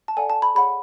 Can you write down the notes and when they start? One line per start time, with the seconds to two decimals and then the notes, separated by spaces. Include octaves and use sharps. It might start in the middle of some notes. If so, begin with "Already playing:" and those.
0.08 A5
0.17 A4 D5 F#5 G#5
0.30 A5
0.42 B5
0.55 G#4 C#5 F#5 B5